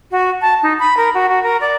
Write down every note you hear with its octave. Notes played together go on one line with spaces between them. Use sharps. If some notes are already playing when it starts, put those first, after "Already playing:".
F#4
A5
D#4
B5
A#4
F#4
F#4
A#4
D5